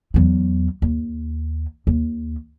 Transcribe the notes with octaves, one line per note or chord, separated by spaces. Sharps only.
E2 F#3
D#2
D#2